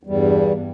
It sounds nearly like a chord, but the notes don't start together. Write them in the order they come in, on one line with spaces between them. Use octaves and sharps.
E2 G3 G2